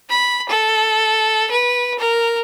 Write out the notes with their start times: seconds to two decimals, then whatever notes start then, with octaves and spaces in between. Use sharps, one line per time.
0.10 B5
0.49 A4
1.51 B4
1.99 A#4